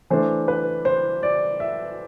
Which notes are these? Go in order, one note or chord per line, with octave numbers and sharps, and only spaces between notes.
E3 A3 D4 C5
B4
C5
D5
E5